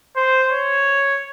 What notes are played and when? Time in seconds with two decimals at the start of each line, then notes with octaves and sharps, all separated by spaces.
0.16 C5
0.52 C#5